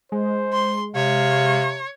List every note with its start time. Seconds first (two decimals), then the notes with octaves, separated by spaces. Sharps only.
0.12 G#3 C5
0.53 C6
0.96 C3 C#5 F5